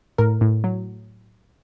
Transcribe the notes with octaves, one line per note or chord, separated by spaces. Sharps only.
A2 A#4
A2
F#3